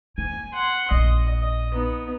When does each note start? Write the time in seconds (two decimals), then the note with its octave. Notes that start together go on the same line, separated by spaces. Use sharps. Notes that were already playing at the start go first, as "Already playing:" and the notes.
0.18 A#3 G#5
0.53 F#5 C6
0.91 A#1 D#5
1.42 D#5
1.74 B3 D#4